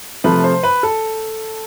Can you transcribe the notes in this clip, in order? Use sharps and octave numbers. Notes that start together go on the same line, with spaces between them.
C3 F3 A3 B4
C5
B4
A4